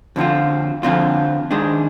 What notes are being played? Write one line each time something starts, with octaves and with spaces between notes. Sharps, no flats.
F2 D3 F3 C4 F4
F2 D3 F3 C4 F4
D#3 G#3 D4 G#4 C5